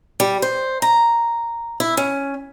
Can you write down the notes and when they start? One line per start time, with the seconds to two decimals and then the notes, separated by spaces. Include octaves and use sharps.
0.20 G3
0.42 C5
0.82 A#5
1.80 E4
1.97 C#4